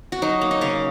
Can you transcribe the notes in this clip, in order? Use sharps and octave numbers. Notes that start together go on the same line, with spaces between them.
F#4
F#3 D#4
A#3
D#4
C#3 C#4